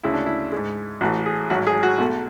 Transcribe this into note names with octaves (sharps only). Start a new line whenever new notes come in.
D2 C#3 G#3 E4
D4
E4
G#2 G#3
A1 A2 E3 F#4
G#4
G#1 G#2 F#3 F#4
G#4
F#4
B1 B2 A3